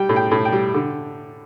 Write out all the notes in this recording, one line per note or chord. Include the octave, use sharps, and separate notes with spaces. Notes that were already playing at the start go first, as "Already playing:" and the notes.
Already playing: G3 G5
A2
G5
A2
G5
G3
D3